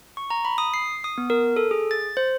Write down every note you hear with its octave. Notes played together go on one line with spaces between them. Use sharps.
C#6
A#5
B5
D#6
C7
D#6
B3
A#4
A4
G#4
A6
C5